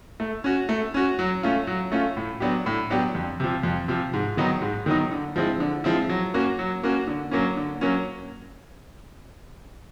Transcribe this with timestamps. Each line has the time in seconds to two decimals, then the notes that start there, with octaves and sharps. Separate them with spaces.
0.20 A3
0.44 C#4 F#4
0.69 A3
0.94 C#4 F#4
1.19 F#3
1.43 A3 C#4 F4
1.67 F#3
1.92 A3 C#4 F4
2.17 A2
2.40 F#3 B3 D4 G4
2.66 A2
2.90 F#3 B3 D4 G4
3.15 F2
3.40 C3 F3
3.63 F2
3.88 C3 F3
4.13 G#2
4.37 D#3 F#3 B3 D#4
4.62 G#2
4.86 D#3 F#3 B3 D#4
5.12 D3
5.36 F3 G#3 C4 E4
5.60 D3
5.84 F3 G#3 C4 E4
6.09 F#3
6.34 A#3 C#4 F#4
6.59 F#3
6.83 A#3 C#4 F#4
7.08 D3
7.31 F#3 A#3 C#4
7.57 D3
7.81 F#3 A#3 C#4